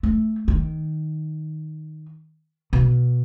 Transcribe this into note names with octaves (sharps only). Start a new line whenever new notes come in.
A3
D#3
B2